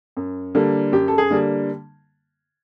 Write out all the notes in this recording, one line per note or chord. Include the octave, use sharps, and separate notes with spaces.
F#2
D3 G3 A#3
F#2 G4
A4
G#4
D3 G3 A#3